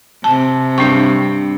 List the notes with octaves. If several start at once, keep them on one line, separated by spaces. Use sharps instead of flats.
C3 A5
G2 D4 G5 C#6